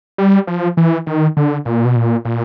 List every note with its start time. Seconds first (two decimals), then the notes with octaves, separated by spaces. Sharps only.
0.18 G3
0.47 F3
0.77 E3
1.07 D#3
1.37 D3
1.65 A#2
1.85 B2
1.96 A#2
2.25 A#2